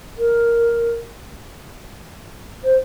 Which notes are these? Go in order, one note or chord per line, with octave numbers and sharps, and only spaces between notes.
A#4
C5